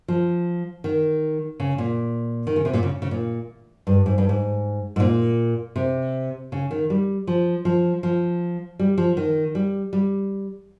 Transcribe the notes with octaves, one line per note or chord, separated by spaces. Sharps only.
F3
D#3
C#3
A#2
D#3
C#3
C3
A#2
C#3
C#3
A#2
G2
G#2
G2
G#2
G#2
A#2
C3
C#3
D#3
G3
F3
F3
F3
G3
F3
D#3
G3
G3